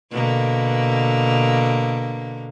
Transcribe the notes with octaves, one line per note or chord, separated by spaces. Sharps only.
B2 D3 A#3